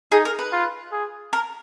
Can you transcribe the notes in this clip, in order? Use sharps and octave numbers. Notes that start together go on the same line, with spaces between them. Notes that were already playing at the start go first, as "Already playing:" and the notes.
D#4 G#4
A#4
B4
F4
G#4
A#4